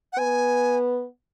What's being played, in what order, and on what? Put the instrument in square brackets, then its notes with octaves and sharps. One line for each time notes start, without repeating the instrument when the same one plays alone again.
[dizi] F#5
[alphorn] B3 [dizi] G#5